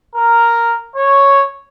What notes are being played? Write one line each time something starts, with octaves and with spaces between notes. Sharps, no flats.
A#4
C#5